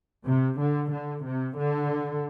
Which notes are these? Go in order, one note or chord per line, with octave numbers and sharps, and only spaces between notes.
C3
D3
D3
C3
D3